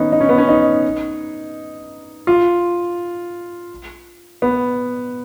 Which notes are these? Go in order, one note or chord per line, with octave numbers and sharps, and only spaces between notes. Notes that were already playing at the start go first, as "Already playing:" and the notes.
Already playing: D#3 B3 C#4 D#4
D#4
C#4
B3
C#4
D#4
F4
B3